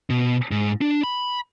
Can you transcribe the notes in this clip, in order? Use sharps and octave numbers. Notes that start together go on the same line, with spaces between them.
B2
G#2
D4
B5